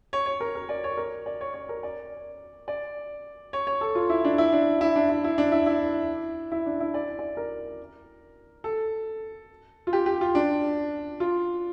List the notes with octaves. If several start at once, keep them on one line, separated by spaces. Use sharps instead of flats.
C#5
C#5
A#4
A#4
D5
C#5
A#4
D5
C#5
C#5
A#4
D5
D5
C#5
C#5
A4
F4
E4
D4
E4
D4
E4
D4
E4
E4
D4
E4
E4
E4
D4
E4
D5
D5
A#4
A4
F4
G4
G4
F4
D4
F4